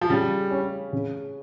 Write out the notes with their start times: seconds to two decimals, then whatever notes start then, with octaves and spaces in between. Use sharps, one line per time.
0.01 F3
0.09 C#3 G3
0.51 C#4
0.93 C#3